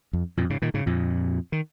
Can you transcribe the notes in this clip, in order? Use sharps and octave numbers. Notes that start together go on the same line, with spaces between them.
F2
F2 A#2
G#2 C#3
A#2 D#3
G#2 C#3
F2 A#2
D#3